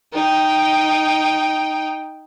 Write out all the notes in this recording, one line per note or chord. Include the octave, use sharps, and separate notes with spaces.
D#4 G5